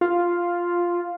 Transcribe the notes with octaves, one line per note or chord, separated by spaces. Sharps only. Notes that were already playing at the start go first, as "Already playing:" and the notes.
F4